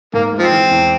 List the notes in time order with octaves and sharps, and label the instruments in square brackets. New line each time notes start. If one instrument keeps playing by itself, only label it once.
[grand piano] G#2 [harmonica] A#3
[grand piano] G#3
[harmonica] F3 C4
[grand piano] E3
E2